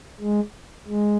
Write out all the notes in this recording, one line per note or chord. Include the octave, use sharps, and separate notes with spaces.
G#3
G#3